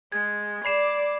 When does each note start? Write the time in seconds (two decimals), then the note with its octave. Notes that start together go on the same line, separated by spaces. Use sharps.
0.12 G#3 G#6
0.65 D5 B5 C7 E7